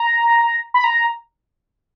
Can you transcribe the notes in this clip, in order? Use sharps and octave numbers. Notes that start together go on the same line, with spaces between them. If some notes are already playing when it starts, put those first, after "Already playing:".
Already playing: A#5
B5
A#5